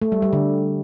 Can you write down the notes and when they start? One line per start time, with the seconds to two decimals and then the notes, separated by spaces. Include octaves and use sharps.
0.02 A3
0.12 G3
0.22 G3
0.33 D3